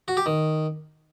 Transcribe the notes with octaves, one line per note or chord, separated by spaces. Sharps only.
F#4
G4
D#3